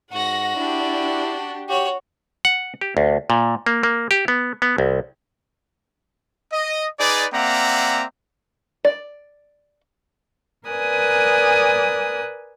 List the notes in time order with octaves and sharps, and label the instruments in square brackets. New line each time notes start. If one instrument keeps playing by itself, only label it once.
[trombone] G#2 [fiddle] F#4 [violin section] F#5 A#6
[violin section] D4 G4 [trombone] E4
[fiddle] F#4 C#5 [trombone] G4
[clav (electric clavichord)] F#5
G4
D2
A#2
A#3
A#3
G4
B3
B3
C2
[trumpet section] D#5
D#4 G#4 B4 D5
A#3 C4 D5 E5 F#5 A#5
[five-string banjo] D5
[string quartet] A#4 B4 D5 G#5 D#6 F#6